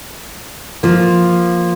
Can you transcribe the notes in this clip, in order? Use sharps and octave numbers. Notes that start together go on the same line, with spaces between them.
F3 A#3